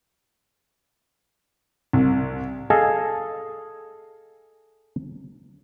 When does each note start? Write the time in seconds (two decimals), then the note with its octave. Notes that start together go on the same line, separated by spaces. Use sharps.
1.93 C2
2.70 G#4 A4 D#5 F5 G#5